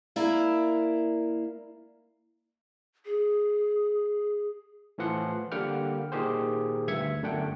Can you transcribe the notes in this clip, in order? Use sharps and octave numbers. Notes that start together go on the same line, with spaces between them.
A#3 E4 A#4 D5
G#4
A2 E3 F3 F#5 C6
D3 G3 A#3 F#5 G5 F6
A#2 D#3 G4 G#4 C5
D2 G2 E5 G#6 C#7
G1 F#2 A3 D4 F#5 G5